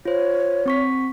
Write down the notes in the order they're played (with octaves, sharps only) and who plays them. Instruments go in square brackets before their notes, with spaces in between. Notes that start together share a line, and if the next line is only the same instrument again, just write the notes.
[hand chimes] F4 C5 [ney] C#5
[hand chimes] C4 C#6 B6